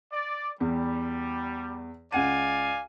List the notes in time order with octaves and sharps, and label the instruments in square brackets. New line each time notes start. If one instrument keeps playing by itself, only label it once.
[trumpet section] D5
[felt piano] E2 [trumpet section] G3
[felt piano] C#2 F#5 D#7 [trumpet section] D5 F5 G#5